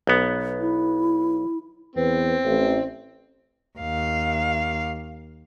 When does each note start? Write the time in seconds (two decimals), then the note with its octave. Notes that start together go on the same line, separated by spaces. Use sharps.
0.07 B1 B3
0.60 E4
1.95 E2 C4 B4
2.44 A1
3.79 D#2 F5